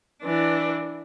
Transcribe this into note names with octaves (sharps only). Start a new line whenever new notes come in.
E3 D4